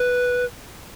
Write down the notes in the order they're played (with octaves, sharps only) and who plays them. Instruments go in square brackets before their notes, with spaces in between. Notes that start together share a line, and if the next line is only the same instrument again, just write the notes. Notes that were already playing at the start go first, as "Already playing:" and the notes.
Already playing: [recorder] B4